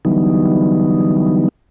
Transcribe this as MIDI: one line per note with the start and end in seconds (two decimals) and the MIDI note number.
0.05 1.49 50
0.05 1.49 52
0.05 1.49 54
0.05 1.49 55
0.05 1.49 59
0.05 1.49 63